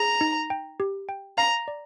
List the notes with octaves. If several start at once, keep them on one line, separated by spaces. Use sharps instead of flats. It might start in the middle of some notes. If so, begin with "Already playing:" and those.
Already playing: G#4 A#5
D#4
G5
G4
G5
F5 A#5
D5